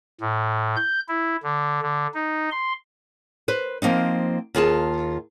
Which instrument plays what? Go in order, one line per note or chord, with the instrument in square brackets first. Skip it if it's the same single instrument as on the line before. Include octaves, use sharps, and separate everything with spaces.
[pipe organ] A2
G6
E4
D3
D3
D#4
C6
[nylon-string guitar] B4 C5
F3 A#3 C4 D#4
D#2 F4 G#4 A5